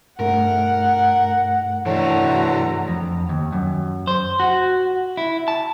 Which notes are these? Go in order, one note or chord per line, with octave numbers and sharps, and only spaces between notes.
G2 A3 A#4 F#5
A2 E3 D4 F#4 A#5
F2
D#2
F#2
C5
F#4
E4
A5